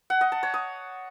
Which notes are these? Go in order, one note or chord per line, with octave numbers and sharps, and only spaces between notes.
F#5
D#5
A5
C#5
D#6